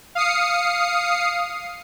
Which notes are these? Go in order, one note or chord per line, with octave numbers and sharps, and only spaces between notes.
F5 D#6 C7 C#7